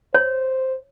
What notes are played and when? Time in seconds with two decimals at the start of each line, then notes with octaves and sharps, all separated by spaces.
0.14 C5 C#5